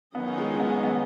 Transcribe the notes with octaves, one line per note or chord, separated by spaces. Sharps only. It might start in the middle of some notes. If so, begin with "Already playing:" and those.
D#3 F#3 B3 C#4 G#4 D#5
G#3
G#3
B3
B3